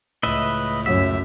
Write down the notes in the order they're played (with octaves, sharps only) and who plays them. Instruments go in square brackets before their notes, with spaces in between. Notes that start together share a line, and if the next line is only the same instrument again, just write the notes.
[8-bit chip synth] C#2 A2 [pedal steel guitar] B4 D#5 E5
[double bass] F#2 [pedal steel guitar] E5